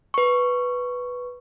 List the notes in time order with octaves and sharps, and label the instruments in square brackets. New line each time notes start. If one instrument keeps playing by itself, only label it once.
[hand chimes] B4 C#6